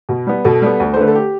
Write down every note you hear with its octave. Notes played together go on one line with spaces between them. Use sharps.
B2
G3 B3
B2 A4
G3 B3
D2
C5
D3 A3 B4
A4
G4